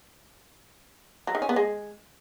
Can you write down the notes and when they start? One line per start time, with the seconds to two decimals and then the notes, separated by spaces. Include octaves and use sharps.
1.27 F#3
1.35 D#3
1.42 C#4
1.49 B3
1.56 G#3